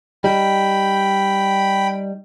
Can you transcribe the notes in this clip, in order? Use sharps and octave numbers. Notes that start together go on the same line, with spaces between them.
G3 D#4 G5 B5